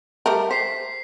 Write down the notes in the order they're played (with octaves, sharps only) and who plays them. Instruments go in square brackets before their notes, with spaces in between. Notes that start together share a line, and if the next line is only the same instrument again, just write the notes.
[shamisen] G3 A3 A#4
[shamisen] C5 [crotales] B6 C7